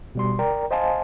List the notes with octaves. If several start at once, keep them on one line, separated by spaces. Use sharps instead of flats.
B2 G3 C6
A#4 D5 G5 A#5
C5 D#5 F5 G#5 A5 C6